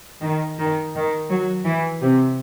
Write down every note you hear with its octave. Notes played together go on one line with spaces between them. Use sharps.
D#3
D#3
D#3
F#3
E3
C3